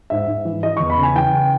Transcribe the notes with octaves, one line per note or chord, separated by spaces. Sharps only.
G#2 E5
G#2
E3
E3 D#5
E2 C#6
B5
C#3
G#5
E3 G5
C#3